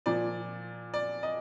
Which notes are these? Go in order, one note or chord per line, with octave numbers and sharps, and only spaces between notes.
A#2 F3 D5
D5
D#5